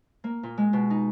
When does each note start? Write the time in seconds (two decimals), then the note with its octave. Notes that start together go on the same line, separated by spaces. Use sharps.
0.24 A#3
0.43 A#2
0.57 G#3
0.73 B2
0.90 D#4